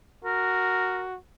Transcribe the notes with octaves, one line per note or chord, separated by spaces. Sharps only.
F#4 A#4